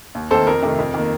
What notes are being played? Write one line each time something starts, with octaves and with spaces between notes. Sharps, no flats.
D#2
D#3 A3 C4 A4 C5
F2 A#4
C3 D#3 A3
F2
D#3 A#3